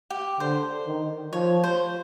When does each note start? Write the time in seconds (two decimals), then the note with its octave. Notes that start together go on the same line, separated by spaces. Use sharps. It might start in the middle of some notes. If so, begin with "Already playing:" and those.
0.10 G4
0.40 D3 C5
0.87 D#3
1.33 F3 C#5
1.64 C5